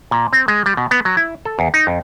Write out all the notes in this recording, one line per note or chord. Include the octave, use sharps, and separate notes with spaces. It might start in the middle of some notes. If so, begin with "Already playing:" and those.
A#2
C4
G#3
G3
B2
B3
F#3
E4
A4
E2
D#4
F2